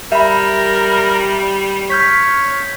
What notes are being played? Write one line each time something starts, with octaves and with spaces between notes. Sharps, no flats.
G3 A#4 E5 B5
C#5 F6 G6 B6